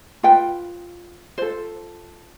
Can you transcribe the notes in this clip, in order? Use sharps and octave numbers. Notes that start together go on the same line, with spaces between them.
F4 B4 G5
F4 A4 C5